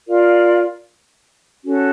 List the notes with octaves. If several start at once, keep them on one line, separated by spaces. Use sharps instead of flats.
F4 A#4 D5 F5
C#4 F#4 A4